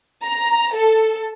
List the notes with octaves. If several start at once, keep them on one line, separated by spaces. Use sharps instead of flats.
A#5
A4